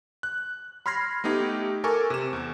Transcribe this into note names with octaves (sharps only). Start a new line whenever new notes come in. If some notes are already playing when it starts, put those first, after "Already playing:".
F#6
B5 C6 F6 G#6 A#6 C7
A3 B3 D#4 G4
A4 A#4 G#5 C#6 D6
C3 E7
E2